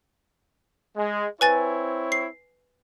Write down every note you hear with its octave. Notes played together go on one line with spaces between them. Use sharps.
G#3
C4 E4 B4 C#5 G#5 A6
C7